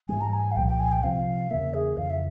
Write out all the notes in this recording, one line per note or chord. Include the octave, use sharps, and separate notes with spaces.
G#2 E3 G3 G#5
A#5
G#5
F5
C2 A#2 F3 G5
G5
G#5
G5
C3 F3 C4 F5
E2 C#3 E3 A#3 E5
G#4
F2 C#3 E3 F5
E5